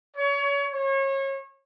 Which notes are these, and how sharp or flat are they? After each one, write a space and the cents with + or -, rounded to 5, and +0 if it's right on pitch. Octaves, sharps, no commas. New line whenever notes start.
C#5 +30
C#5 -30